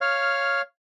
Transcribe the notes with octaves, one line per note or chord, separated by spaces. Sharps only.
C#5 F5 F6